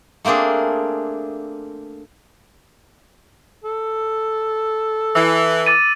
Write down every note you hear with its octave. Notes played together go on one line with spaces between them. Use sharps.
A3 A#3 C4 D4 G#4
A4
E3 E6
D6 A6 D#7